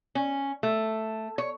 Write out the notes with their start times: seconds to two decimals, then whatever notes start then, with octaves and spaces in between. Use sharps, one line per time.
0.15 C#4
0.63 A3
1.38 C#5